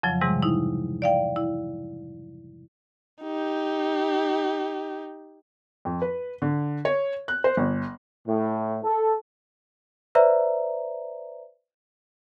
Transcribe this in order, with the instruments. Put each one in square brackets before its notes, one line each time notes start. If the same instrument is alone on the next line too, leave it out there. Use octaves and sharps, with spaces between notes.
[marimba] F2 C#3 F3 F#3
G#2 C3 E3 G3 G#3
D#4 E4
D5 F5 G5
E4
[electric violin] D#4 G4
[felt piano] F2
B4
D3
C#5
F#6
C5
G1
[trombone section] A2
A4
[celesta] B4 C5 D5 E5 A#5